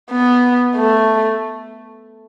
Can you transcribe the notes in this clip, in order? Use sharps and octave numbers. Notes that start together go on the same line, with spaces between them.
B3
A3